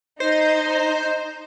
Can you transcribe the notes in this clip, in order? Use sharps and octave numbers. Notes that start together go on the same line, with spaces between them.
D#4 C5